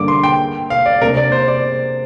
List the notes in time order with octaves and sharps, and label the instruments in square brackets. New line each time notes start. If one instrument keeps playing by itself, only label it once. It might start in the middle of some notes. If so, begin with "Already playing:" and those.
Already playing: [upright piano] G2 D3 G3 A#3 D4 [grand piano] D6
[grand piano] C6
G5
F5
D5
[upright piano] C3 A#3 D4 [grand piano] A#4
[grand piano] D5
C5
D5